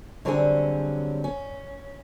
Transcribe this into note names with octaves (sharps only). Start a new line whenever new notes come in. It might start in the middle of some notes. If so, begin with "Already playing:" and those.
D3 F#3 G3 C4 C#4 G#4
C#4